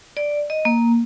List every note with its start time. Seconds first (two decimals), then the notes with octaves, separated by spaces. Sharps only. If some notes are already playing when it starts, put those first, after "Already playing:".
0.17 D5
0.50 D#5
0.65 A#3